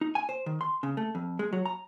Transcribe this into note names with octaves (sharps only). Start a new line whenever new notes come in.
D#4
G#5
C5
D#3
C6
C#3
A3
F2
G#3
F#3
A#5